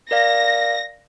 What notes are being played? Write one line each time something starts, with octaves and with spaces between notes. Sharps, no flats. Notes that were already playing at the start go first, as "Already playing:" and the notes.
A#4 D5 F5 A#6